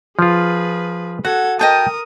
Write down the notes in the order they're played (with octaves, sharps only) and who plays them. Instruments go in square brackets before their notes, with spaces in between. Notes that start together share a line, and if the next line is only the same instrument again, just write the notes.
[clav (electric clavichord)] F3 F4 [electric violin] G#4 B4
[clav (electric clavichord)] F#4 [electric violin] A4 G#6 [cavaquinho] F#5
[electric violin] A#4 D#6 [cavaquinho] D#5 G5 A5